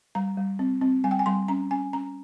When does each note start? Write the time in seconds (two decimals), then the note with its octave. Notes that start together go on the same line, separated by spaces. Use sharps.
0.15 G3 A#5
0.37 G3
0.59 C4
0.81 C4
1.04 G3 G#5
1.11 G5
1.19 G#5
1.26 G3 C6
1.48 C#4 A#5
1.71 C#4 G#5
1.93 C#4 A#5